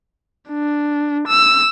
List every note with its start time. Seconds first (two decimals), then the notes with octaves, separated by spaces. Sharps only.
0.50 D4
1.28 E6